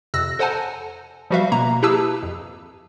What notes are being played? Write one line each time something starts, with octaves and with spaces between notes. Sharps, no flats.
F2 C3 E6 F#6 A#6
A4 C5 F#5 G#5 A5
F3 G3 F#4 B4 E5 F5
B2 A#3 A#5
E4 G4 G#4 B4 A5 E6
F2